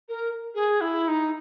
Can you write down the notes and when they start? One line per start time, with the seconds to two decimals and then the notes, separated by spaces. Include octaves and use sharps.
0.09 A#4
0.55 G#4
0.81 E4
1.08 D#4